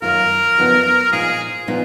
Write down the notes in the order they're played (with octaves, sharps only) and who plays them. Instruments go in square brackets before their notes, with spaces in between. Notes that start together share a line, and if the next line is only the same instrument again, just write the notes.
[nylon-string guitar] F#2 D#3 A#3 F4 [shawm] A#4
[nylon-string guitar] F#2 C#3 F3 B3 D#4
[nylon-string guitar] A#2 F3 A#3 D#4 [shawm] G#4
[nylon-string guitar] A#2 F3 B3 D#4